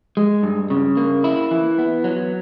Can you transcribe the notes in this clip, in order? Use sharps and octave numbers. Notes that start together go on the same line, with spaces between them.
G#3
G2
C#3
A#3
E4
E3
B3
F#3